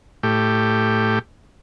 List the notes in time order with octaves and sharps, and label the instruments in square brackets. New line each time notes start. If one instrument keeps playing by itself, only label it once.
[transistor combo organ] A2 G4